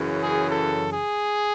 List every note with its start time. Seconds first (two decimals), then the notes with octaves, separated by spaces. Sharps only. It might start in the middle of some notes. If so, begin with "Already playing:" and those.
Already playing: F#2 C#3 E3
0.21 G#4
0.49 A4
0.92 G#4